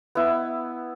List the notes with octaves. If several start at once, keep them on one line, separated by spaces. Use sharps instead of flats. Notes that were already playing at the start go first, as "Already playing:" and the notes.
B3 E4